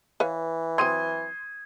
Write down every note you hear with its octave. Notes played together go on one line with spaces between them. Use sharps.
E3 B4 C#5 F5
F#3 C4 C6 D#6 G#6 D#7